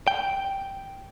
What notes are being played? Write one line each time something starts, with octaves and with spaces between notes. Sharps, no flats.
G5